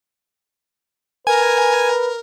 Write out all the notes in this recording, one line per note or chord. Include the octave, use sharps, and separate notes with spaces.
A#4 B4 G#5